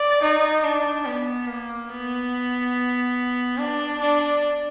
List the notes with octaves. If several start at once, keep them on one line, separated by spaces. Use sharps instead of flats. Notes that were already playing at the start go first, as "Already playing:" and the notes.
Already playing: D5
D#4
D4
B3
A#3
B3
D4
D4